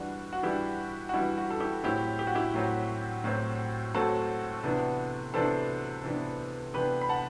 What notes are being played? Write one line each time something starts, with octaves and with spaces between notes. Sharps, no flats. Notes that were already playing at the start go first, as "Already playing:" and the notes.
Already playing: E3 G3 D4 F#4
F#4
E3 G3 D4 E4 G4
F#4
E3 G3 D4 E4
F#4
A4
E4 G4
A2 F#3 C4 E4 G4
G4
F#4
E4 G4
A2 F#3 C4
A2 F#3 C4
A2 F#3 C4 F#4 A4
C3 E3 B3 D4
C3 E3 B3 D4 A4 C5
C3 E3 B3 D4
C3 E3 B3 D4 G4 B4
B5
F#5 A5